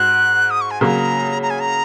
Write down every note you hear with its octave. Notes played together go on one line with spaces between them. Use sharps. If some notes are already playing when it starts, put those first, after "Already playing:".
Already playing: G#2 F#4 F#6
D#6
C#6
G#5
C#3 F#3 A#3 A#5 C#6
A#5
G#5
A#5